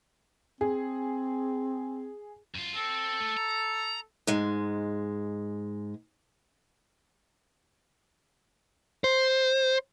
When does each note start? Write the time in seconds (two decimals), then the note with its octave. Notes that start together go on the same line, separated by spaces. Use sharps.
0.61 C4 G#4
2.55 F#2 F4
2.76 C4 A4
3.20 A3
3.37 A#5
4.27 G#2 G#3
9.04 C5